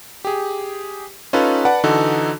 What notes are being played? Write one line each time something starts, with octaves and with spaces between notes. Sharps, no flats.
G4 G#4
C#4 D#4 F4 A4 B4
B4 D5 F#5 A5
D3 E3 D#4 F#4 A4